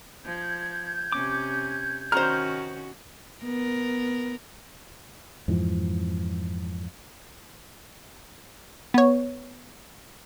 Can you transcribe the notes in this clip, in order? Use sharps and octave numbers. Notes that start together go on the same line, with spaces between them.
F3 G6 G#6
C3 C#4 D6
D#3 C#4 F#4 C5 A#5 F6
B3 A#4
F2 G#2 E3 F3
B3 C#5